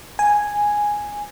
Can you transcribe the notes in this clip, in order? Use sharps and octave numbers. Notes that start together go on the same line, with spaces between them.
G#5